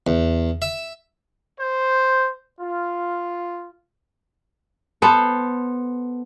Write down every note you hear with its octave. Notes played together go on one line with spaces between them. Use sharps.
E2
E5
C5
F4
B3 A4 C5